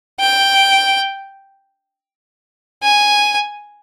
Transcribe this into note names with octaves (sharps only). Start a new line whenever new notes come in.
G5
G#5